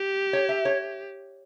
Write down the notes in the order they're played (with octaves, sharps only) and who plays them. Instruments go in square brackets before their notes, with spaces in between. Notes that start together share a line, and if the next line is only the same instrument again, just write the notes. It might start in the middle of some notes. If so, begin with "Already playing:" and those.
Already playing: [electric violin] G4
[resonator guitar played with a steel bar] C#5
E5
C#5